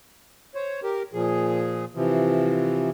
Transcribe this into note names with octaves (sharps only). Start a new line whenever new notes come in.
C5 C#5
G4 A#4
A#2 F3 G#4
C3 E3 F3